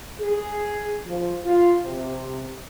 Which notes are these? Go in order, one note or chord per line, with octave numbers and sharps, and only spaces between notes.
G#4
F3
F4
C3